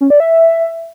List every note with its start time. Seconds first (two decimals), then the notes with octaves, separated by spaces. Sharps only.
0.01 C#4
0.10 D5
0.20 E5